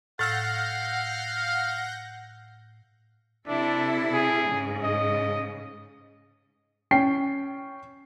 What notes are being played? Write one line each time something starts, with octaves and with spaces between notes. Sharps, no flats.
A2 F5 F#5 E6 F6 G6 A6 A#6
C3 D4 E4 A4
G#4
G#2 C#3
D#5
C#4 G5 C7